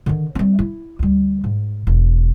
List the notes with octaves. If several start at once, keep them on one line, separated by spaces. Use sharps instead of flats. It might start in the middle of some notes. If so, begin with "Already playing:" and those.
D3 D#3
G3 C4
E4
D2 G3
G#2
E1